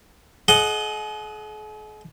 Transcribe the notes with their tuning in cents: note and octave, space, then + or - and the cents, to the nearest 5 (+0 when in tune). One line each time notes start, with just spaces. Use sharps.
G#4 +45 D#5 +0 F#5 +0